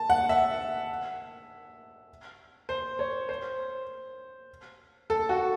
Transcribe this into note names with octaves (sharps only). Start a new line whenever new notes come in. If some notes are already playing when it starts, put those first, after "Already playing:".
Already playing: A5
F#5
E5
C5
C#5
C5
A4
F#4